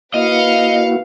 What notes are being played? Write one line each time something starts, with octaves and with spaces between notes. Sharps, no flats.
A#3 E4 F#4 B4 D#5 F5 C#7